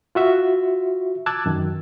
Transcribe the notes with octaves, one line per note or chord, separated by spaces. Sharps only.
F4 F#4 E5
A5 D6 E6 F#6 G#6 A6
F#2 D#3